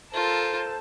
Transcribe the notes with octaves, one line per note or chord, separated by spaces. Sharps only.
F4 A4 A#4 C5 A5